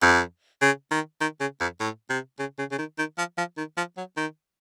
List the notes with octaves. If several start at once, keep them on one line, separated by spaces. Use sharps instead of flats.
F2
C#3
D#3
D#3
C#3
F2
A2
C3
C#3
C#3
C#3
D#3
D#3
F3
F3
D#3
F3
F#3
D#3